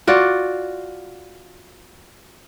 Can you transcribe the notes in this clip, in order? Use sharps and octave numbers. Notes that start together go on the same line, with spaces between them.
F4 F#4 D5